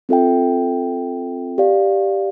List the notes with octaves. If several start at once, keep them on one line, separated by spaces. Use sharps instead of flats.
C4 F4 A4 E5 G5
G4 D5 F5